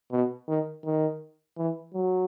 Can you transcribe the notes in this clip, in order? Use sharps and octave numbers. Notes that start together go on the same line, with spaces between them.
B2
D#3
D#3
E3
F#3